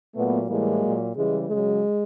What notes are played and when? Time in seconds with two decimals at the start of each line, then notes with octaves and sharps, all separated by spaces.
0.15 A#2 F#3 A3 B3
0.48 A2 E3 G3 G#3 A#3
0.82 A#2 F#3
1.15 C#3 E3 G3 G#3
1.49 C#3 F#3 G#3